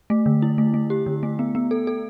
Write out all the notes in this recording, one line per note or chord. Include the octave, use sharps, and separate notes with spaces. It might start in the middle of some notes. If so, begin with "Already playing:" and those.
A3
D3
E4
A3
A3
G4
D3
A3
B3
B3
A4
A4